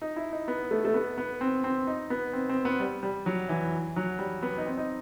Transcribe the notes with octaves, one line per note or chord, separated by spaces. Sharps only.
D#4
E4
D#4
B3
A3
A3
B3
B3
C4
C4
D#4
B3
C4
C4
B3
G3
G3
F#3
E3
F#3
G3
B3
D#4
C4
D#4